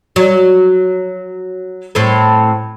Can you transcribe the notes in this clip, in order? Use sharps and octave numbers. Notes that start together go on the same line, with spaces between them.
F#3
A2 C4 A4